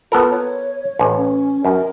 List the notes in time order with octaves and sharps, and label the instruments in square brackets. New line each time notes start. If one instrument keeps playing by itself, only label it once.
[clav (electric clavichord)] B3 A4 A#4 [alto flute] F4
[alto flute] C#5
[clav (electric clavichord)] A1
[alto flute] C#4
[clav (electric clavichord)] F#2 [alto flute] A#4